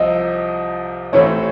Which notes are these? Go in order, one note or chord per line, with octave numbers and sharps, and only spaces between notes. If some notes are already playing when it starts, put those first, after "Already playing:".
Already playing: C2 C3 F3 D#5
A1 A2 E3 A3 C4 C#5